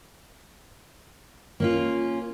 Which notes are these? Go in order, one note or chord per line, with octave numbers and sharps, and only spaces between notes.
A#3 C#4 F4